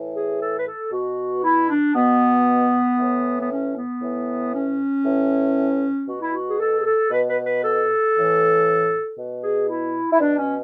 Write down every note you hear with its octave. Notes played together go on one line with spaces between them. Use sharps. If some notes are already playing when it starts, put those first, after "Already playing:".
Already playing: A2 E3
G#4
A4
B4
A4
B2 F#4
E4
D4
B2 B3
A2 E3
B3
C#4
B3
A2 E3
C#4
A2 E3
B2 F#4
E4
F#4
G#4
A4
G#4
A4
B2 B4
B4
B4
A4
A2 E3
B2
G#4
E4
E4
B2 D4
C#4